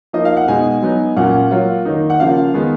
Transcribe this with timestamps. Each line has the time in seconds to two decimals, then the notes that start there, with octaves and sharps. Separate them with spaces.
0.13 F3 A#3 D#4 D#5
0.25 F5
0.37 F#5
0.48 B2 G#3 D#4 G#5
0.82 F#3 B3 D#4
1.16 A#2 F#3 C#4 F4 F#5
1.51 F#3 A#3 F4
1.85 D#3 A#3 D#4
2.10 F#5
2.20 C#3 F3 A#3 F4 F5
2.54 D#3 G#3 B3